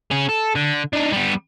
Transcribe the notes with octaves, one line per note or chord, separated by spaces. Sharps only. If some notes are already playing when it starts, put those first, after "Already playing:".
C#4 G#4
A4
D3
D4 D#4
G3 B3